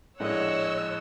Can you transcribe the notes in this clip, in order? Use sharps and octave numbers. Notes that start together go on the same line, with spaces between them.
A#1 A2 G#3 C#5 D#5 F#5 E6